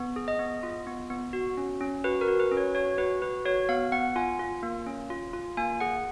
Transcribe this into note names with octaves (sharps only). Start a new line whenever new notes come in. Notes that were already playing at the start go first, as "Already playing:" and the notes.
Already playing: B3
G#4
D#5
B3
F4
B3
B3
F#4
C#4
C#4
F#4 B4
A#4
F#4
B4
C#4
C#5
F#4 C#5
F#4 B4
F#4 B4
F#4 C#5
B3 F5
B3 F#5
F4 G#5
F4
A#3
C#4
F4
F4
A#3 G#5
G#4 F#5